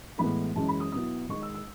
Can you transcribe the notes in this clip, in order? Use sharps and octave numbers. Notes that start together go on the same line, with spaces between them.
A2 E3 G#3 B3 B5
F#2 E3 G#3 C#4 A5
B5
D#6
B2 F#3 B3 E4 D#6
D#3 G#3 D#4 C#6
E6
E6